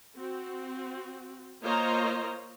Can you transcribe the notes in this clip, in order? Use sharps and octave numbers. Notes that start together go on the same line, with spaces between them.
C4 F#4
A#3 F4 C5 C#5 D#5 A#5